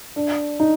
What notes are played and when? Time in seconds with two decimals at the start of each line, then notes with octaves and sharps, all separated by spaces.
0.16 D4
0.60 D#4